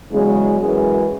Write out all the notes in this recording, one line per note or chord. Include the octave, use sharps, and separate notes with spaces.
E2 C#3 F#3 G#3
F#2 E3 G#3